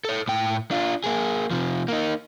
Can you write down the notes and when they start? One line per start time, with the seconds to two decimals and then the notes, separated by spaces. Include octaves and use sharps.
0.05 A4 C#5
0.28 A2 G5
0.71 D4 F4
1.04 A#3 G#4
1.51 C3 F3
1.88 A#3 D#4